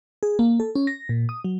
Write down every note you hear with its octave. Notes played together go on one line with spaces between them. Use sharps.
G#4
A#3
A4
C#4
A#6
A#2
D#6
F#3